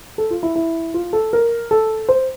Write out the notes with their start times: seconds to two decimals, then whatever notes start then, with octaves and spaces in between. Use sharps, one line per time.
0.18 A4
0.31 F4
0.43 E4
0.56 E4
0.94 F4
1.13 A4
1.33 A#4
1.71 A4
2.09 C5